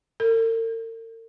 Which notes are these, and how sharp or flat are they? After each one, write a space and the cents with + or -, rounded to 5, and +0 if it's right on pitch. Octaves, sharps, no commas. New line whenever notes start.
A#4 -45